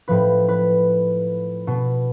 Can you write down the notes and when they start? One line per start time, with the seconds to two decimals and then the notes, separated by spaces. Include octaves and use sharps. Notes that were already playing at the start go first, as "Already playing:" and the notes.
0.08 A2 F3 B4
0.49 B4
1.67 B2